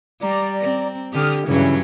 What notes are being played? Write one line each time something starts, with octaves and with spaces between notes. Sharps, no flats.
G3 D5 A#5
C4
D3 G4 D#6 F6
G2 C#3 E3 F#3 C#4